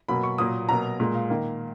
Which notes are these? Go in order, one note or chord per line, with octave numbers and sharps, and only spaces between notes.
B2 F#3 A#3 B5
C#6
A#2 F#3 A#3 D#6
B2 F#3 A#3 A#5
A#2 G#3
F5
D#3 A#3